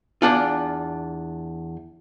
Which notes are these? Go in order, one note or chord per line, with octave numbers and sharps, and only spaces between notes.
E2 C#4 D4 F4